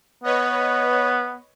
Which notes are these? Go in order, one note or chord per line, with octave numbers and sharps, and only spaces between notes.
B3 B4 C#5 D#5